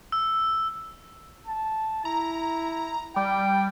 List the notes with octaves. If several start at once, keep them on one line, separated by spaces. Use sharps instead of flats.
E6
A5
E4 A#5
G3 G5